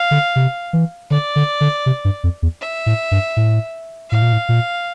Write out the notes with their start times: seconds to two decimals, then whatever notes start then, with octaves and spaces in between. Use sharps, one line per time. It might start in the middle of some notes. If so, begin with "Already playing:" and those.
Already playing: F5
0.11 D3
0.36 C3
0.73 E3
1.10 D3 D5
1.36 D3
1.61 D3
1.86 C3
2.05 G2
2.24 F2
2.42 E2
2.61 E5
2.86 A2
3.11 G2
3.37 A2
4.11 A2 F5
4.22 A#2
4.33 A2
4.49 A#2